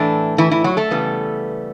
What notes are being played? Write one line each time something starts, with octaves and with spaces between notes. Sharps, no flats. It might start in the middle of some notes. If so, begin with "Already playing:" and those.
Already playing: A2 E3 A3 D4
E3 E4
E3 E4
F#3 F#4
A3 A4
C#3 E3 G3 B3